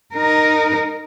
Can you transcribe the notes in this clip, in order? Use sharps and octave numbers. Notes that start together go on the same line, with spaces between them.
D#4 A#4